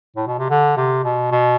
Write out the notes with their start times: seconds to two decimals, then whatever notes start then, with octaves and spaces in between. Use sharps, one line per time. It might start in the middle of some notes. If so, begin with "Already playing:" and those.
0.16 A2
0.27 B2
0.39 C3
0.50 D3
0.77 C3
1.04 B2
1.31 B2